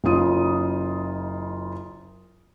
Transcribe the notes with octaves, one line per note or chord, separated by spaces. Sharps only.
F#1 C#3 D#4 F4 D#6 D#7